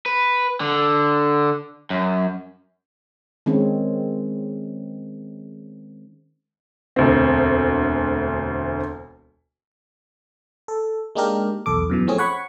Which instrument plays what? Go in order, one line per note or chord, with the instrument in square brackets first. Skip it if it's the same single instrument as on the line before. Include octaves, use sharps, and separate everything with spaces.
[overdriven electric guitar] B4
D3
F#2
[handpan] D#3 G#3 C4 C#4
[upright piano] E1 D2 C4
[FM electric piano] A4
G#3 A#3 D4 D#4 G4 A#4
B1 E2 A4 D6
F#2 B2 E3
F3 A3 C4 C#4 G#4
C#5 F#5 B5 C#6